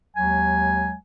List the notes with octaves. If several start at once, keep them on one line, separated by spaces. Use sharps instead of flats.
D#2 F#3 G#3 G#5